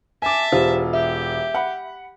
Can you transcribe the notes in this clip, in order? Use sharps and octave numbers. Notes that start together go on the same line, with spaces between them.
E5 G#5 A5 D6
E1 F4 G4 C5
G4 E5
F#5 B5